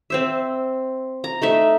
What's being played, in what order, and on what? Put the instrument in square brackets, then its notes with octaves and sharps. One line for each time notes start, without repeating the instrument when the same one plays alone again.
[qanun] C4 C5 E5
A#5
A3 D#4 E5